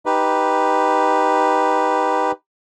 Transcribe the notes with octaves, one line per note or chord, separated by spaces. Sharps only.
D#4 G4 B4